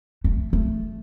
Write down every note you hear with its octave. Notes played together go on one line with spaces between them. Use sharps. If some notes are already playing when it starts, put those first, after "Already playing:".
A3
A3